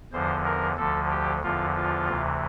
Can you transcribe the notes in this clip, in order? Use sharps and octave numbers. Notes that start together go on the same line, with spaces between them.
E2 D3 F3 C5
A#4
D2 D3 F3 A4
G4
E2 D3 F3 F4
F4
D2 C3 E3